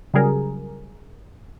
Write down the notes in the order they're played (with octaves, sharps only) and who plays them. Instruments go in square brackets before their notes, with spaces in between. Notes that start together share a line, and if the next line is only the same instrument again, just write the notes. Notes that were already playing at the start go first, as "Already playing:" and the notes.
[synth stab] C#3 F#3 G3 G#4 A#4